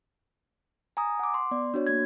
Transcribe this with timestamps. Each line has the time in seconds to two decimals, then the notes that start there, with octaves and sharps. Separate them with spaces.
0.97 G#5 A#5 D#6
1.19 F#5 D6
1.34 C6
1.51 B3 D5
1.74 D4 F#4 C#5
1.87 A#3 G#6